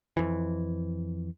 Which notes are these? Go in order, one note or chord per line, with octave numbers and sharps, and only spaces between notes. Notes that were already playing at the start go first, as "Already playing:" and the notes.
F2 E3